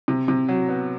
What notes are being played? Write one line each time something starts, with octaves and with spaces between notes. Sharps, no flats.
C3
C3
F#3
B3